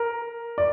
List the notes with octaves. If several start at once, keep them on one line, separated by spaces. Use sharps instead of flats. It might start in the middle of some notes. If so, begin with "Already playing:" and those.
Already playing: A#4
D5